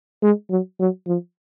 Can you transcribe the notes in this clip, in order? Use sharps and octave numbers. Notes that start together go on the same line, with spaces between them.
G#3
F#3
F#3
F3